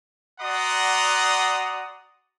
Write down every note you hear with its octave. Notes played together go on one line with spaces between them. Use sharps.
F#4 D5 F#5 A#5 C6 D#6